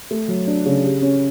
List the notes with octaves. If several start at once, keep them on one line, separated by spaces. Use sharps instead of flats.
A3
F#3
D4
C#3
G4
C#4